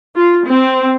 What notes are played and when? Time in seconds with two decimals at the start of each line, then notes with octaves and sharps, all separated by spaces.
0.16 F4
0.45 C4